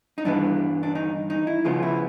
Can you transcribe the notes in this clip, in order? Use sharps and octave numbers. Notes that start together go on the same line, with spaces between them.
D#4
G2 E3 G3 B3 D4
D4
D#4
D#4
E4
C#2 C#3 F3 G#3 B3 F4
E4